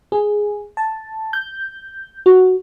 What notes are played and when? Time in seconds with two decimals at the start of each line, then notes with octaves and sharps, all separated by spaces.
0.12 G#4
0.77 A5
1.33 G6
2.26 F#4